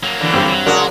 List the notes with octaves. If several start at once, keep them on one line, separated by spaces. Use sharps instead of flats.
F#3 A#3
D3 E3
G2 C4 G4
F#3
C#3 G#3 D4 F#4 A#4 D5